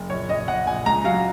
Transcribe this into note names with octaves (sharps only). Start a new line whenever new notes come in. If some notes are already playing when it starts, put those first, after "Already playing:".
Already playing: F#1
A#1 C#5
A#1 D#5
A#1 F#5
A#1 G#5
C#2 A#5
F#3 F5